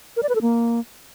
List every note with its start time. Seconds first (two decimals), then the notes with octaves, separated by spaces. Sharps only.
0.17 A#4
0.23 D5
0.29 B4
0.35 A4
0.42 A#3